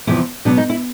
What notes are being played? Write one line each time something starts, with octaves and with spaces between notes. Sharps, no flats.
E2 C3 F3 E4
B2 F#3 B3 D4
D#4
E4